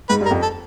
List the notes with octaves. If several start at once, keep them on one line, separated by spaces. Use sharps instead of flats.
G#2 B4
G2
A#4
F2
A4